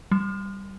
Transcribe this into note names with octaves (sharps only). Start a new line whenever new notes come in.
G3